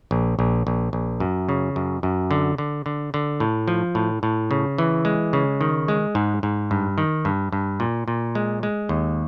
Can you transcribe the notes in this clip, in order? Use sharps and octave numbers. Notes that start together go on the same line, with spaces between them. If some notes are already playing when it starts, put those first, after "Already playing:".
A#1
A#1
A#1
A#1
F#2
C#3
F#2
F#2
D3
D3
D3
D3
A2
F3
A2
A2
C#3
E3
G#3
C#3
D#3
G#3
G#2
G#2
G2
D#3
G2
G2
A#2
A#2
G#3
G#3
D#2